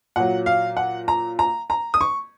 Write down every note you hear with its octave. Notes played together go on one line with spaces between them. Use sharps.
A#2 F#3 F#5
F5
F#5
A#5
A#5
A#5
D#6
C#6